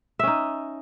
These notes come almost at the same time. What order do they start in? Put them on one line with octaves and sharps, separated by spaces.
E5 C#4 D#4